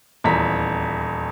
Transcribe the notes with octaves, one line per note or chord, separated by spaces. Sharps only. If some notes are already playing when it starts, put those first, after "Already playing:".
D#1 E2 A#5 B6